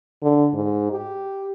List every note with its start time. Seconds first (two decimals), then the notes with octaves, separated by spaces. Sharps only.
0.23 D3
0.54 G#2
0.92 G4